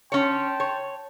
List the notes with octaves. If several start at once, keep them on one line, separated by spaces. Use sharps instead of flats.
C#4 C#5 G5 A5 C6
C#5